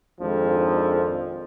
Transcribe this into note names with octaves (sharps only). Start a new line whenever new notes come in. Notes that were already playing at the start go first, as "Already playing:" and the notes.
G#1 F2 G#2 F3 D4 A4